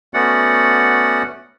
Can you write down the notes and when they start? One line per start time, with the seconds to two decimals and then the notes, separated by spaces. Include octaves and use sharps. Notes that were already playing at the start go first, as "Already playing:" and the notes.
0.14 A3 B3 C#4 F#4 D5 F#5